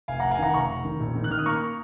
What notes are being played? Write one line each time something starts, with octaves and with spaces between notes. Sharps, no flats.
F1 F5 G#5
F#5 A#5
F1
F5 G#5
D#3 F#5 A#5
F1 A#5 C#6
F1
D#3
A#1
D#3
F#6
D#3 F6
D#6
A#3 A#5 C#6